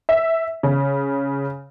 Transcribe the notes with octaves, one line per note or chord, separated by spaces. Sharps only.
E5
C#3